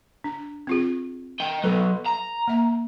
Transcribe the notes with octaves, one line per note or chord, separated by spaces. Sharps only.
D4
C4 F4 G#4
D#5 G5
F#3 B3 A4 B4
A#5
A#3 E5